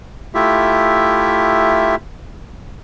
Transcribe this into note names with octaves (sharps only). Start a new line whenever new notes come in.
A3 E4 F4 G4 E5